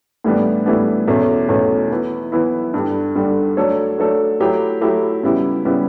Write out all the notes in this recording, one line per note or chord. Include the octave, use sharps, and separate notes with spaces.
A2 E3 G3 B3 D4
A2 E3 G3 B3 D4
E2 B2 A3 C#4
E2 B2 A3 C#4
E3 B3 E4
E3 B3 E4
G2 D3 G3
G2 D3 G3
F#3 A3 D4 A4 C#5
F#3 A3 D4 A4 C#5
F#3 A3 E4 G4
F#3 A3 E4 G4
C#3 G3 B3 E4 G4
C#3 G3 B3 E4 G4